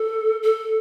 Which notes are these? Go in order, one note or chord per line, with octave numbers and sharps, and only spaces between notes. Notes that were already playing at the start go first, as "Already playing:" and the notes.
Already playing: A4
A4